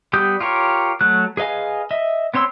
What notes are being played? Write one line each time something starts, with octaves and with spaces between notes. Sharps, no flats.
G3 B3 G4 D#6 G6
F4 G4 A#4 C#5
F#3 A3 F#6
G#4 B4 D#5 F5 G#5
D#5 E5
B3 C4 C#5 C6 E6